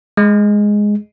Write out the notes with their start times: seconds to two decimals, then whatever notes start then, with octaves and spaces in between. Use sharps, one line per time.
0.17 G#3